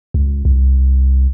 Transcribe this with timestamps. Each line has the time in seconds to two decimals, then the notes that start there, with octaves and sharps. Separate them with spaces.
0.14 C#2
0.45 C2